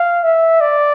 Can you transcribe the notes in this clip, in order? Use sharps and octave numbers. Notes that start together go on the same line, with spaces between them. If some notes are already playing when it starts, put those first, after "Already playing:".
Already playing: F5
E5
D5